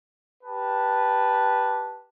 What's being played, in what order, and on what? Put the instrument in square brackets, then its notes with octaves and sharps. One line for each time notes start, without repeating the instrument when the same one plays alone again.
[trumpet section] G4 B4 A5